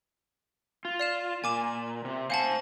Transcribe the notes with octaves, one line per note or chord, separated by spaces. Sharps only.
F4
D5 F5 E7
A#2 G#5 D6 E7
C3
C5 F5 F#5 G#5 A5